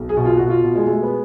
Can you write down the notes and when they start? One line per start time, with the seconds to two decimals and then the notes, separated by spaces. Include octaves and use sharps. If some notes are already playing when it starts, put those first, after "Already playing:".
Already playing: B1
0.09 G#4
0.17 B2
0.25 F4
0.37 B2 F#4
0.50 F4
0.63 B2
0.75 G#3
0.87 G#3 A3
1.03 B3